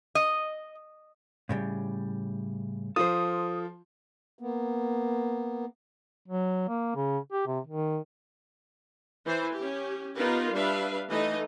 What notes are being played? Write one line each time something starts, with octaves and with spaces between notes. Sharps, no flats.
D#5
A2 C#3 G3
F3 F4 A4 C5 D#6
A#3 B3
F#3
A#3
C#3
G4
C3
D#3
E3 C5
C#4 G4
B3 D#4 F4 G4 A#4 B4
G3 D4 B4 E5 F5
E3 A3 D#4 D#5